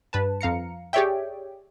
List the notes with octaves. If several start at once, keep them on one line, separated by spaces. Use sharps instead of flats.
G2 B4 A5
F2 F5 A#5 C#7
G4 G#4 C#5 D5 E5 G5